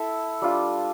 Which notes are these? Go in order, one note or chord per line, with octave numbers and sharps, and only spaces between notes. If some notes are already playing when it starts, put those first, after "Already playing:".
Already playing: E4 A4 E5
G3 D4 F4